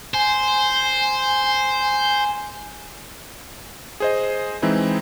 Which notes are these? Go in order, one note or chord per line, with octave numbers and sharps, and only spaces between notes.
C5 G#5
G#4 C5 D#5
E3 G#3 C4 D#4 E4